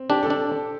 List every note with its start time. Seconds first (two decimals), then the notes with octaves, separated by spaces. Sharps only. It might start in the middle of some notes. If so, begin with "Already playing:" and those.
Already playing: C4
0.10 D4 G4
0.23 A4
0.30 D4